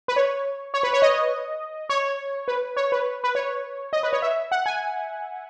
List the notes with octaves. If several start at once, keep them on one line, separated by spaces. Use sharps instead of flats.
B4
C#5
C#5
B4
C#5
D#5
C#5
B4
C#5
B4
B4
C#5
D#5
B4
C#5
E5
F#5
G#5